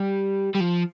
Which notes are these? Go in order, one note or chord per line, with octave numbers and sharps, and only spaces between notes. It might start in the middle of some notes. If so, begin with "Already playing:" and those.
Already playing: G3
G3
F3